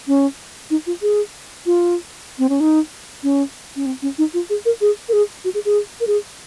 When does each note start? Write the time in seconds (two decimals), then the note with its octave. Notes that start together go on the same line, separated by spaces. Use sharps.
0.07 C#4
0.70 D#4
0.87 F4
1.02 G#4
1.66 F4
2.39 C4
2.49 C#4
2.60 D#4
3.23 C#4
3.76 C#4
3.86 C4
4.02 C#4
4.18 D#4
4.34 F4
4.50 G#4
4.65 A#4
4.81 G#4
5.09 A#4
5.13 G#4
5.44 F#4
5.54 G#4
5.65 G#4
6.00 A#4
6.07 G#4